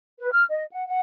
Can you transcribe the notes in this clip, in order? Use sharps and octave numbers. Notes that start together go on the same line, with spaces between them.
B4
F6
D#5
F#5
F#5